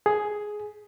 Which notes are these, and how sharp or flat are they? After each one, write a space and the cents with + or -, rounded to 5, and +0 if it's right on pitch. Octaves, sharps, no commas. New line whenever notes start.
G#4 +10